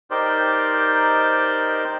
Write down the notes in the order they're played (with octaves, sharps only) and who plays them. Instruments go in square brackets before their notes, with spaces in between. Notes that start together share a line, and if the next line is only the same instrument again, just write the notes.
[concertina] D#4 G4 A#4 C5 D5